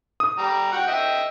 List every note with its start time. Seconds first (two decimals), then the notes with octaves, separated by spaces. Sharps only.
0.20 D#6
0.38 G3 A#5
0.72 F#4 F#5 G5
0.87 D#5 E5 G5